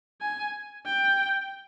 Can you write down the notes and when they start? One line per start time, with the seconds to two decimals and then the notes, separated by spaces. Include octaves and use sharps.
0.21 G#5
0.86 G5